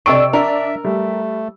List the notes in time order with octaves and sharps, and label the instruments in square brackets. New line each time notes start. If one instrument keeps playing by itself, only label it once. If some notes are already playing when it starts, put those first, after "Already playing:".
[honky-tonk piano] C3 E6 D7 [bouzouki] D4 A4 [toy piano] D#5 G5 C#6
[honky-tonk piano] D4 [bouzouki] A#4 [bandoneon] E5
[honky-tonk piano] G3 [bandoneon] A3